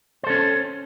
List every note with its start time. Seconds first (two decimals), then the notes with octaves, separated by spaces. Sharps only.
0.23 C5
0.27 A4
0.30 C#4